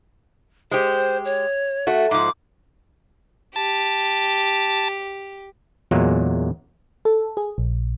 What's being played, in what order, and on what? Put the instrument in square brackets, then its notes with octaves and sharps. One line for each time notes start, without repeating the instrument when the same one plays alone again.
[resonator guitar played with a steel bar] G#3 G4 [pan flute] C5
[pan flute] C#5
[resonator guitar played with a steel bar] A3 F#4
[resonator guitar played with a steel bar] G#2 F3 [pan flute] D6
[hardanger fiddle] G4 [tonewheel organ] A5
[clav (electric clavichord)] E2 A#2 F#3 G#3 A#3
[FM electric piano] A4
G#4
A#1